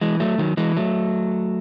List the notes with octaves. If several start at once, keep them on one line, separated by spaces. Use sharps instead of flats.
E3 G#3
F#3 A3
D#3 F#3
E3 G#3
F#3 A3